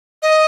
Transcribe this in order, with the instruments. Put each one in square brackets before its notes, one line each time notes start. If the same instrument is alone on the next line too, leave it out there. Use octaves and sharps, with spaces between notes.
[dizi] D#5